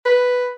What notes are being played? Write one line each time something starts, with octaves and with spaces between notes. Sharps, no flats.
B4